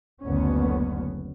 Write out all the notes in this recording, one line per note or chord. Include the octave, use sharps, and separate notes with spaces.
F#1 D2 B3 C#4